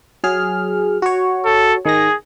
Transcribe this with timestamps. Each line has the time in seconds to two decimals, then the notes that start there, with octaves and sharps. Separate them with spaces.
0.24 F#3 G#4 F6
1.02 F#4 C#5
1.45 A4
1.85 D#3 G#4 A#6